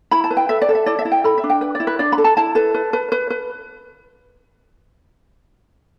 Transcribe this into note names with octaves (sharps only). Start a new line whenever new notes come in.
E4 B5
A5
B4
G5
A4 E5
D5
A4
E5
E4 D5
E5
E4
G5
A4 B5
E5
D4
G5
B4
D5
E4
B4
D4 D5
B5
A4
A5
E4 A5
A4 B4
B4
B4
B4
B4